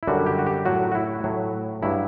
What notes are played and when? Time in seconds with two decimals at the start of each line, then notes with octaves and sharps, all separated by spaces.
0.03 E4
0.07 F#2 D3 G3 F#4
0.26 G4
0.39 F#4
0.46 G4
0.65 A2 F#3 F#4
0.92 F#4
0.95 E4
1.24 A2 F#3
1.83 G2 F#3 E4